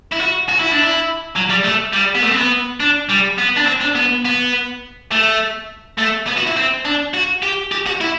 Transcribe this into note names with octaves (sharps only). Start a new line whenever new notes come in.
E4
F#4
F#4
E4
D4
E4
F#3
G3
A3
G3
B3
A3
C4
B3
D4
G3
B3
D4
C4
D4
B3
B3
A3
A3
B3
F#4
E4
C4
D4
F#4
G4
G4
F#4
E4